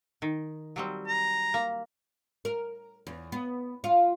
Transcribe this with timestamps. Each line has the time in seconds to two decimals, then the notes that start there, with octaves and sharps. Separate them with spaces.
0.22 D#3
0.76 F#3 G3 C4
1.08 A#5
1.54 A#3
2.45 A#4
3.07 E2
3.32 B3
3.84 F4